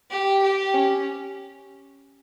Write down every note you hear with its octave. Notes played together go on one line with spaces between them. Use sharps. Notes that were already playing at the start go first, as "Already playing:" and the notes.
G4
G4
C#4